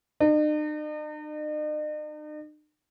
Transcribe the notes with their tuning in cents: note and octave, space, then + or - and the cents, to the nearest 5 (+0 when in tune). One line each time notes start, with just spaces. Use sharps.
D#4 -45